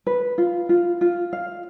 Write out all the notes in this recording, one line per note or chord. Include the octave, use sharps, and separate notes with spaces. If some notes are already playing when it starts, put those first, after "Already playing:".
B4
F4
F4
F4
F5